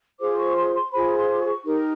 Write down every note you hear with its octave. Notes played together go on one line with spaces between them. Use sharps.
F4 G#4 C5 D6
C#6
C6
C6
F4 G#4 C5 B5
C6
D6
C#6
D#4 G4 A#4